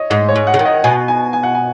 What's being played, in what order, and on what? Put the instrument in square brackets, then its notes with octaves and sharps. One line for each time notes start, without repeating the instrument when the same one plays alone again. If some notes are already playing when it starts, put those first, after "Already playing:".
Already playing: [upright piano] C#5 D#5
[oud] G#2 [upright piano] D#5
[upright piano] C#5
[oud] G#2
[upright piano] F#5
[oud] C#3
D#3
[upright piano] D#5
[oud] B2 [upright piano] G#5
[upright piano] G#5
G#5
F#5
G#5